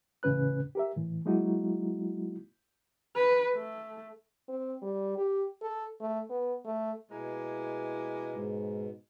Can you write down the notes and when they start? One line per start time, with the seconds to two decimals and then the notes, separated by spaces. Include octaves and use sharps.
0.23 E2 A2 C#3 C#4 B4 F#6
0.75 G4 A#4 E5
0.96 A2 E3
1.25 F#3 G#3 A#3 D#4 E4 F#4
3.15 B4
3.55 A3
4.49 C4
4.82 G3
5.17 G4
5.62 A4
6.01 A3
6.30 B3
6.65 A3
7.11 B2 G#3 A#3 E4
8.35 G#2